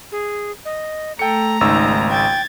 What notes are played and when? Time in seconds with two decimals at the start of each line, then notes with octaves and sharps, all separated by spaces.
0.12 G#4
0.65 D#5
1.19 A3 A4 G5 A#5 C#7
1.61 G#1 C#2 D#4 E6
2.10 G5 G#6 A6